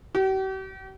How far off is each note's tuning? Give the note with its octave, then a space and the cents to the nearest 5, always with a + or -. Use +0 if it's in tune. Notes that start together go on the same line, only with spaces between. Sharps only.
G4 -45